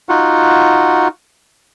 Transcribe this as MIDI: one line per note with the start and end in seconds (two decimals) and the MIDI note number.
0.09 1.08 63
0.09 1.08 65
0.09 1.08 66
0.09 1.08 78